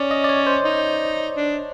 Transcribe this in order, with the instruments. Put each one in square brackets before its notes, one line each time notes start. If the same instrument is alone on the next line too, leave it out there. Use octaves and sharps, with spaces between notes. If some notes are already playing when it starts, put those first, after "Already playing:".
Already playing: [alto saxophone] C#4 [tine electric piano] D5
[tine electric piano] D#5
D5
C#5
C5
[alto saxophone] D#4
D4